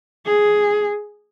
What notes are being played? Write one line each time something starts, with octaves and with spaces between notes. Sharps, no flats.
G#4